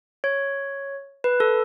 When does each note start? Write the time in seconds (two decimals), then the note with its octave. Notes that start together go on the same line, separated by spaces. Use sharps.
0.24 C#5
1.24 B4
1.40 A4